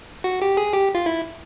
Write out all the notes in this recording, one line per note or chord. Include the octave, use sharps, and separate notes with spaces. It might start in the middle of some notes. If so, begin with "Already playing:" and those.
F#4
G4
G#4
G4
F4
E4